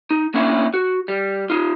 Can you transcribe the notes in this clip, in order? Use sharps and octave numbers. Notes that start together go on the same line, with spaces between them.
D#4
A#3 C#4 D4 E4
F#4
G3
D#4 F4